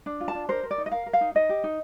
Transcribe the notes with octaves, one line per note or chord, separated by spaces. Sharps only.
D4
F4
A5
D4
A#4 C5
A#4
D5
D#4
D#5
A#4 F5
A#4
F5
D#4
D#4 D#5
G4
D#4